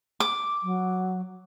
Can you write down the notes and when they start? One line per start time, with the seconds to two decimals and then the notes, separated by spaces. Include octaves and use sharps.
0.20 D6
0.63 F#3